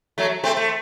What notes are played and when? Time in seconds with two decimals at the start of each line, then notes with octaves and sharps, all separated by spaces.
0.18 F#3 A3
0.44 A3 C4
0.57 A3